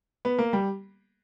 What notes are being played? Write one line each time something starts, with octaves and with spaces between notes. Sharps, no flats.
B3
A#3
G3